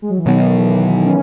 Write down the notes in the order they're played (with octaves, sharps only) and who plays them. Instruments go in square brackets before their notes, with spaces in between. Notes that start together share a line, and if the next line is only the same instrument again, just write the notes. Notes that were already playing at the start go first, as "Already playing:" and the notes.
[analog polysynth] G#3
F#3
E3
[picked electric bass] B2 F#3 B3 [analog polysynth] D#3
[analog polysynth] E3
E3
C#4